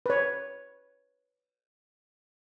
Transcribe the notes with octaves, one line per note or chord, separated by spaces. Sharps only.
B4 C#5